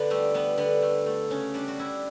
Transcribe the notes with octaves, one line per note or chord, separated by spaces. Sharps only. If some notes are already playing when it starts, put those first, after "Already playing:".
Already playing: D3 B3
G3 A3
G3 B3
D3 B3
A3
A3
C#3 C#4
G3 D4
F#4
G3 E4